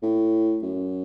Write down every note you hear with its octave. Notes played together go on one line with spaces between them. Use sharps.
A2
F#2